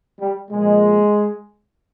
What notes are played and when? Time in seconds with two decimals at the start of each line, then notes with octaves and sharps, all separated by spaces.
0.20 G3
0.51 A#2 F3 G#3